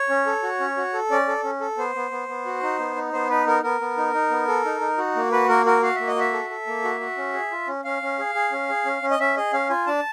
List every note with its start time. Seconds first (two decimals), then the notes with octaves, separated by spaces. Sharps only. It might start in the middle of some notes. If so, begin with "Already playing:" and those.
Already playing: C#5
0.09 C#4
0.26 A4
0.43 F#4
0.60 C#4
0.77 F#4
0.94 A4
1.11 C#4 D5
1.28 A4
1.44 C#4
1.61 A4
1.78 B3 C5
1.95 B3
2.11 B3
2.28 B3
2.46 F#4
2.62 D#4
2.79 B3
2.96 D#4
3.13 B3 C5
3.29 D#4 B4
3.46 B3 A#4
3.63 B3 A#4
3.81 B3
3.97 D#4
4.14 D#4
4.31 B3
4.48 A4
4.65 D#4
4.81 D#4
4.98 F#4
5.16 A#3
5.32 F#4 B4
5.49 A#3 A#4
5.66 F#4 A#4
5.82 F#4 F5
5.95 A#3 E5
6.07 D#5
6.16 F#4 E5
6.33 A4
6.50 A4
6.67 A#3
6.84 F#4
7.01 F#4
7.17 C#4
7.34 G#4
7.52 F4
7.68 C#4
7.84 C#4 F5
8.02 C#4
8.19 G#4
8.35 G#4
8.52 C#4
8.70 G#4
8.85 C#4
9.02 C#4
9.11 D#5
9.19 C#4 E5
9.37 G#4 D#5
9.53 C#4 F5
9.70 F4 G#5
9.86 D4 A5